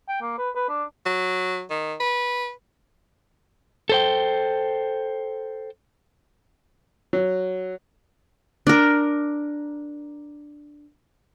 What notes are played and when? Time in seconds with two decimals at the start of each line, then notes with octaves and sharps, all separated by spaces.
0.09 G5
0.21 A#3
0.38 B4
0.55 B4
0.69 D4
1.06 F#3
1.70 D#3
2.00 B4
3.89 A4 C5 G5
7.13 F#3
8.67 D4 A#4